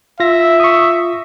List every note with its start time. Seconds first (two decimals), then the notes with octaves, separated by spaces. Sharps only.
0.20 F4 E5 A#6
0.60 C#6 D#6